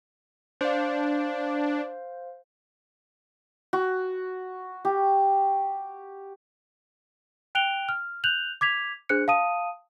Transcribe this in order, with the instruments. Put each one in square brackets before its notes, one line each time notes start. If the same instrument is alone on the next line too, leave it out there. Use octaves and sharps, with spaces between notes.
[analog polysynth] D4 [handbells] C5 F5
[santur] F#4
G4
[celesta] G5 F#6 D7 F7 G7
F6
F#6 G6 F7 F#7
D6 G#6 B6 F7
D4 G#4 C5 F#6 C#7
F5 A5 D#6 D#7